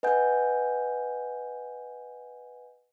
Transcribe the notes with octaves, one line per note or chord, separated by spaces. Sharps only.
B4 D#5 F#5 G#5 G6